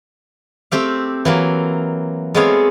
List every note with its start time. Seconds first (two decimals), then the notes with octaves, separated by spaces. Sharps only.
0.72 A3 C4 G4 F5
1.25 E3 F#3 A#3
2.35 G#3 A3 B3 C4 C#5 F5